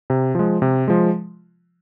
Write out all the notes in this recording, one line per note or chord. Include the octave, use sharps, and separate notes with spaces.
C3
F3 G#3
C3
F3 G#3